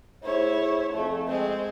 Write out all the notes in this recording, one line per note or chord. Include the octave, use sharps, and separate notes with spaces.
A3 E4 G#4 C5 C#5
F2 A3 G#4
G#3 C4